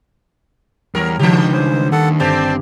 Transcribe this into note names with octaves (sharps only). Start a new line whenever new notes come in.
E2 G3 A#4 C#5
C#2 D#3 E3 D4 G4 B4
C5 G#5
D#2 D4 A4 F#5
G1 C4 D4 G4 C5 D5